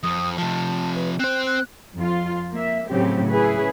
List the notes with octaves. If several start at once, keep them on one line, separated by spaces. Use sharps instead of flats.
F2 D#6
C3 F3 A5
B4
C4 C5 F#6
F#6
F2 F4
A#3 E5
A2 C#3 F#3 C4 G4
C#4 E4 G#4 B4